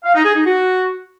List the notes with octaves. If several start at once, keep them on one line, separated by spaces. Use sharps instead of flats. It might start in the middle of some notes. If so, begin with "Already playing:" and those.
F5
D#4
G#4
D#4
F#4